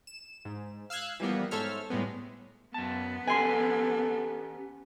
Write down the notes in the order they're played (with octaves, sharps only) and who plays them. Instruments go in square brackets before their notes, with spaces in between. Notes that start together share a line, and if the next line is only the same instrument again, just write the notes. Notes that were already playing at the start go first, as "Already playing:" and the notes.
[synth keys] E7
G#2
F5 E6 F#6 G#6
E3 F3 G3 A#3 B3
G#2 A4 C5 C#5 E5 F6
A2 G3 G#3 B3
[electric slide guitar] F#2 A5 [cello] B3
[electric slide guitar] C#4 G4 B4 [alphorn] A4 [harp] G#5 C6